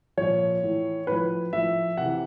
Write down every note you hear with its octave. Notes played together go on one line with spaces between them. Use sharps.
A#2 F3 C#5
A2 E3
A2 F3 B4
A2 F3 E5
C3 E3 F#5